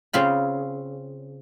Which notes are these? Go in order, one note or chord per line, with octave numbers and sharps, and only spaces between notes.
C#3 C4 F4 B5